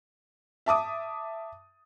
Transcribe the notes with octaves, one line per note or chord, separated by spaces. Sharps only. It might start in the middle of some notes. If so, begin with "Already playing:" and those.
E5 A5 D6 D#6